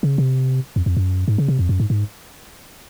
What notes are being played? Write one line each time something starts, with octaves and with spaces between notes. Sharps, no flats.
C#3
C3
F2
F2
F#2
G#2
C#3
C3
F2
F#2
G#2
G#2